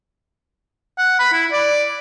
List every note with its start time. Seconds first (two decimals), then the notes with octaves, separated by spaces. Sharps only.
0.98 F#5
1.19 B5
1.33 E4
1.52 D5